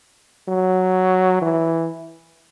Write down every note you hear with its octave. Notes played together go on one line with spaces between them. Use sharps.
F#3
E3